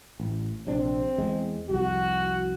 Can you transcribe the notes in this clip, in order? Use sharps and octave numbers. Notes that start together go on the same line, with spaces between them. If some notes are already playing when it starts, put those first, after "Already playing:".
A1
A#1 C3 C4 D4
E2 G#3
C2 F2 F#4